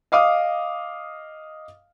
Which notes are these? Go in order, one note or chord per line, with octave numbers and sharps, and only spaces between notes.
D#5 F5 D6 D#6